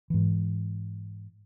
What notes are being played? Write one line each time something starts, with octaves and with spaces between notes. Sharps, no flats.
G#2 E3